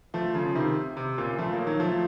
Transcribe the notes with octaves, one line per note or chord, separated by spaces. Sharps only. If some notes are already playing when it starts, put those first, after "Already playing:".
F3 A3
C#3 F3
C3 D#3
C3
A#2 C#3
F3 A3
F#3 A#3
D#3 F#3
F3 A3